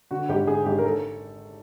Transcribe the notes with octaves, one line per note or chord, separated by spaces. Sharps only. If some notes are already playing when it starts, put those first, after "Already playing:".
D3 F#4
G#1 G4
D3 G#4
G#1 G4
A#4
A4